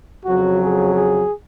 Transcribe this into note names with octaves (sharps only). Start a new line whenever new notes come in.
F2 C#3 F#3 F#4
G#4
G#4